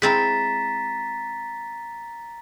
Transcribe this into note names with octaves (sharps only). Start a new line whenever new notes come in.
G#3 C4 E4 A#5 A6 B6